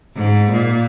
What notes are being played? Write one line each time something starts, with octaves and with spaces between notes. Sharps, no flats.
G#2
A#2